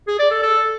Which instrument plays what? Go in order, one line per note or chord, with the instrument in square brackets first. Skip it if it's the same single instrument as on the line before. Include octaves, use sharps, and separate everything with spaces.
[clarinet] G#4
D5
A4
A4